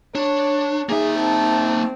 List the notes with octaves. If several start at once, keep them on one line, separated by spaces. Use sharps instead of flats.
D4 C#5
A#3 D#4 G#4 E5
C4 A5